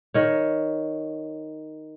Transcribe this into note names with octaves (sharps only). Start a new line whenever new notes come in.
D#3 C#5